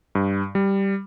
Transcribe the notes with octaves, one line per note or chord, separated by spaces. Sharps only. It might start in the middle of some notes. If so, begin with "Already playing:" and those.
G2
G3